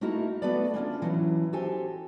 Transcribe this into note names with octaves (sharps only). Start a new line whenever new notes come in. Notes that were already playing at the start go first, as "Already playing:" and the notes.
A3 A#3 D#4 E4 F#4 A#4
A3 B3 F#4 A4 B4 D5
A#3 C#4 D4 F4
E3 F#3 C#4
F#4 G4 A4 C5 G#5